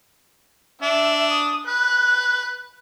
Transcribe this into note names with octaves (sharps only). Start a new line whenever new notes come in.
D4 E5
D#6
B4 F#6